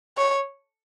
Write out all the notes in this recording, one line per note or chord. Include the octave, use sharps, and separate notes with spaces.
C#5